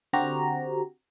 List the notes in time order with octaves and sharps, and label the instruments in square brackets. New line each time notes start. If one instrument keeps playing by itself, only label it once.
[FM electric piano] D3 C4 F#4 G4 A#5